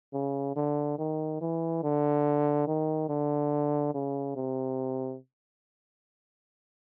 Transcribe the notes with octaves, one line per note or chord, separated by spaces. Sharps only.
C#3
D3
D#3
E3
D3
D#3
D3
C#3
C3